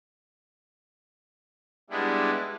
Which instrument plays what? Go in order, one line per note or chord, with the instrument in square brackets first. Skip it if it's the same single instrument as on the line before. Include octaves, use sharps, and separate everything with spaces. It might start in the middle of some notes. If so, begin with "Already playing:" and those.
[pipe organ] G3 G#3 B3 D4 E4